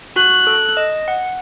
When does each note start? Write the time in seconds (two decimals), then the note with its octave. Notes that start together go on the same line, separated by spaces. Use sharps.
0.16 F#4 F#6
0.47 A4
0.77 D#5
1.08 F#5